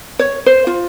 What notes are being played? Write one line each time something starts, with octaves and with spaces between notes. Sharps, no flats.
C#5
C5
F4